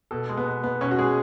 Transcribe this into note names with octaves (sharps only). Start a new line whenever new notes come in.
B2 A4
G#3
B3
B2
B3
B2 C#4
F#4
G#3 G#4